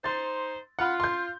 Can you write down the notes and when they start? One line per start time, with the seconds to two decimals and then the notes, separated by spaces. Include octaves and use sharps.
0.04 D#4 C5 C6 A6
0.79 F4 F#5 B5
1.00 C6 G6